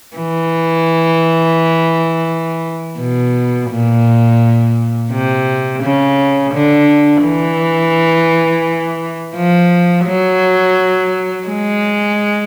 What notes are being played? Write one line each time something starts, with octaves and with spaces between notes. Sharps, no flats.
E3
B2
A#2
C3
C#3
D3
E3
F3
F#3
G#3